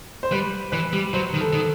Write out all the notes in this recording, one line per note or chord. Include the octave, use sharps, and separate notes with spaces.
C5
G3 B4
E3 B4
G3
F#3 C5
D#3
A4
D#3